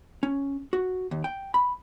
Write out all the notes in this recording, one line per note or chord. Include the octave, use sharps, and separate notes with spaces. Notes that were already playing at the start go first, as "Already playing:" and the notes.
C#4
F#4
D#2
G5
B5